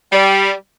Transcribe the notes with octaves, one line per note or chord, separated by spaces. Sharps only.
G3